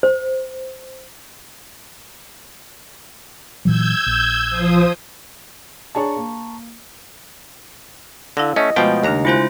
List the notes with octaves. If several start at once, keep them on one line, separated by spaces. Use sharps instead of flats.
C5
A#2 E3 F#3 E6 G6 G#6
A#1
F3 C5 D#6
D4 G#4 C#5 A5 A#5 C#6
A#3
D3 E4 F5 A#6
A3 C#4 D#5
B2 F3 G#3 A3 G5
D#2 C#3 D4 A#5 F#6
G#3 E4 F4 C5 G#5 F#6